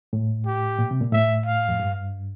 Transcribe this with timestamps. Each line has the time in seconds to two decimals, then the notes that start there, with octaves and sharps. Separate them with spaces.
0.13 A2
0.46 G4
0.79 A#2
0.91 C3
1.01 A#2
1.12 A2 E5
1.46 F5
1.69 F2
1.79 G2